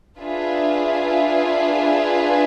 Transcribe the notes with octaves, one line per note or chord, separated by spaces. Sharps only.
D4 F4 G#4 B4 E5